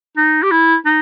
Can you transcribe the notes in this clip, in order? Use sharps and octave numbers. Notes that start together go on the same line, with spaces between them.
D#4
G4
E4
D#4